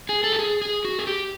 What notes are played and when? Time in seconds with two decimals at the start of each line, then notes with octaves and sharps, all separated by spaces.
0.09 G#4
0.24 A4
0.32 G4
0.39 G#4
0.62 G#4
0.85 F#4
0.99 G#4
1.07 G4